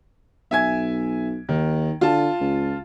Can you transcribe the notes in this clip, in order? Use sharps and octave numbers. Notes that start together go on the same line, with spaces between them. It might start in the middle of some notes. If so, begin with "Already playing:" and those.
B1 E5 G#5 G#6
D#2 D#3
D3 F4 A5
C#2